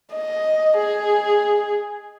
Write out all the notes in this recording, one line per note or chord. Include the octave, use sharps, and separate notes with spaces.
D#5
G#4